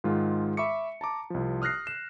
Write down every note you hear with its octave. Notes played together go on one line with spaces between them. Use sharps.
G#2 D#3 G#3 F4
E5 B5 C#6 D6 C#7
A5 A#5 D6
C2 F3
D#6 F6 F#6 A#6 C7
E7